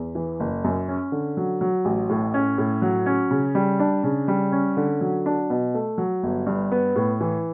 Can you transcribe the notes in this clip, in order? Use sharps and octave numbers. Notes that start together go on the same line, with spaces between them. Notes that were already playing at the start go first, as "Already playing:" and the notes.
Already playing: E2
E3
F#1
F#2
C#4
D3
F#3
F#3
A1
A2
C#4
A2
F#3
C#4
C#3
G3
D4
C#3
G3
C#4
D3
F#3
D4
B2
A3
F#3
G1
G2
B3
A2
E3